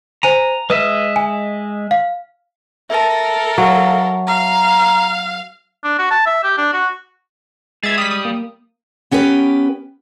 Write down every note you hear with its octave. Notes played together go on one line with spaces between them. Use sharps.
C5 G#5 A#5 D#7
G#3 B4 D#5 E5
G#5
F5
A4 A#4 E5 A5
F#3 F5
F5 A#5
D4
F#4
A5
E5
G4
D4
F#4
G#3 G#4 E5 G#6 A6
G3 D#6 B6
D#6
A#3
B3 C#4 G4 A#4 B4